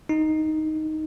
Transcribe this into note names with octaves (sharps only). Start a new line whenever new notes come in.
D#4